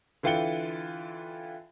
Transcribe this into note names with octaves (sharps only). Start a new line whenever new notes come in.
D3 E3 F4 G5 C#7 G7